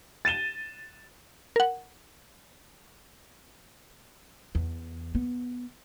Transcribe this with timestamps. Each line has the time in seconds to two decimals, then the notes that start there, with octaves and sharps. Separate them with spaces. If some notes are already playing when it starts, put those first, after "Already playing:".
0.25 A6 D#7 E7 G7
1.56 A#4 F#5
4.55 E2
5.15 B3